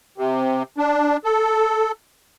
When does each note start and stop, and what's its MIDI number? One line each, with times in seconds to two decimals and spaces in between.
0.18 0.63 48
0.78 1.17 62
1.24 1.92 69